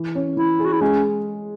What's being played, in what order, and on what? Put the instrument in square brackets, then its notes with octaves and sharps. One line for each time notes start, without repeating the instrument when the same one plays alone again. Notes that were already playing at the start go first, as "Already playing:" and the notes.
Already playing: [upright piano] E3
C#4
[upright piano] E3 [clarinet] E4
[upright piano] G#4
[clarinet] F#4
E4
[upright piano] G#3 [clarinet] C#4